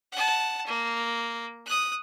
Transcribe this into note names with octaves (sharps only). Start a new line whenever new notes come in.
F#5 A5
A#3
D#6 F#6